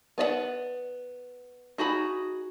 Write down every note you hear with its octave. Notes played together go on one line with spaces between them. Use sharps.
B3 D5 D#5 F#5
D#4 F#4 G#4 B5